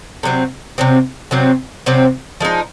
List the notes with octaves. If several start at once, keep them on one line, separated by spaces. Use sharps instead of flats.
C3 F#3 C4
C3 F#3 C4
C3 F#3 C4
C3 F#3 C4
F3 G#3 D#4